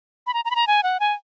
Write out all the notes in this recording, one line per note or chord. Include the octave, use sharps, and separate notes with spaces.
B5
A#5
A#5
B5
A#5
G#5
F#5
G#5